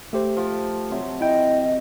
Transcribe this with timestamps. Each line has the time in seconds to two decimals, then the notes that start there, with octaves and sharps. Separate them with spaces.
0.13 A3 G4 C5
0.37 F3
0.90 C3 F#3 C4
1.21 E4 D#5 G5